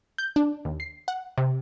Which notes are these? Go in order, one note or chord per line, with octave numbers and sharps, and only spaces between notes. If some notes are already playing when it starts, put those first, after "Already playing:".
G6
D4
D#2
C7
F#5
C3